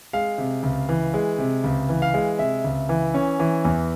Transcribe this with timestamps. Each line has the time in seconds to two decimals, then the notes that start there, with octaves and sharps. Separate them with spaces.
0.13 G#3 F5
0.38 C3
0.63 C#2
0.89 E3
1.14 G#3
1.39 C3
1.64 C#2
1.89 E3
2.02 F5
2.14 G#3
2.39 C3 E5
2.64 C#2
2.89 E3
3.14 C#4
3.39 E3
3.65 E2